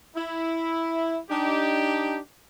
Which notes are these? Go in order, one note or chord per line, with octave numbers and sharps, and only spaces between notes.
E4
D4 D#4 G4